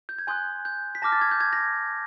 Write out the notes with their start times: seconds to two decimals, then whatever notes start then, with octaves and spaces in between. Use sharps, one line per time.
0.09 G6
0.18 G#6
0.27 G#5 C6 D#6 F#6 G6
0.65 G6
0.95 B6
1.02 A5 D6 F6 A#6
1.12 A6
1.21 G#6
1.31 G6
1.41 G#6
1.53 A#6